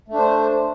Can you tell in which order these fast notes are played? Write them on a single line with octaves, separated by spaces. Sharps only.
A3 D4 C5